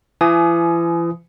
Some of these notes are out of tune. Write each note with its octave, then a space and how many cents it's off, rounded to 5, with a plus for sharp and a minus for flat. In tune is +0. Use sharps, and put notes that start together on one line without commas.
E3 +40 G#5 +35 D#6 +0